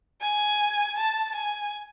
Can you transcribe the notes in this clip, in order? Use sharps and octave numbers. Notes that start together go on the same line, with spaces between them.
G#5
A5
G#5